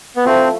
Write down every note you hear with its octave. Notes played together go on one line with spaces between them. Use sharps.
B3
F3 A3 C4 E4 A4